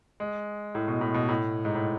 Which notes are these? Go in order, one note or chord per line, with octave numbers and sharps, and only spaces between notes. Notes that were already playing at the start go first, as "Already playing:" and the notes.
G#3
A2
B2
A2
B2
A2
G#2
A2